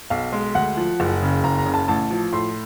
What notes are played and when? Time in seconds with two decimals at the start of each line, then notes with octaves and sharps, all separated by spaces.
0.10 B1 F5
0.32 G#3
0.55 D2 F#5
0.77 F3
1.00 F#1
1.22 C#3
1.44 F#1 A#5
1.58 A#5
1.66 C#3
1.74 A5
1.88 A1 A5
2.11 F3
2.32 A2 C6